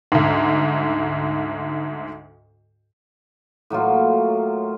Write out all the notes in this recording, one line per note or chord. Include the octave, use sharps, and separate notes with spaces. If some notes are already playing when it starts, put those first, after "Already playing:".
D2 G#2
A2 F#3 A#3 F4